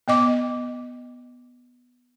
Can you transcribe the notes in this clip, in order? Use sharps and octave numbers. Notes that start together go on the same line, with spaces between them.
B3 D#5 D6